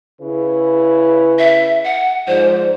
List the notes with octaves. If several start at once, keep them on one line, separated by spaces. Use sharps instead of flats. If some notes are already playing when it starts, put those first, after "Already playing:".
C#3 E4 B4
E5
F#5
G#2 F3 C5 D5